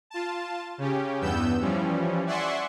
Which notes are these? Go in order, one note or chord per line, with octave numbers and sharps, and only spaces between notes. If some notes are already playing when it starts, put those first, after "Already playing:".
F4 A5
C#3 C#4 G4
E2 G2 B3 E6 G6
E3 F3 G3 C#4
D5 E5 F#5 G#5 C6 C#6